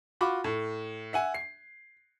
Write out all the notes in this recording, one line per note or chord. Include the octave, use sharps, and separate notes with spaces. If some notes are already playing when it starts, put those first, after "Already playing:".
F4 F#4 B5 D6
A2
E5 F#5 G#5
C7